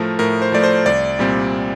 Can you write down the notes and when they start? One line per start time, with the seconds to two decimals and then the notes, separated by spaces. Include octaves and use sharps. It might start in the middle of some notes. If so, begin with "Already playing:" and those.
Already playing: A2 F3 A3 A#4
0.19 A2 A#4
0.42 C5
0.52 F3 A3 D5
0.63 C5
0.86 C2 D5
1.19 A#2 G3 C4